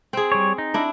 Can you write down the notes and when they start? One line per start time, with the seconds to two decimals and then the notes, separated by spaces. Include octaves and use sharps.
0.13 C4 G#4
0.32 G3 C#5
0.58 D#4
0.74 D4 E4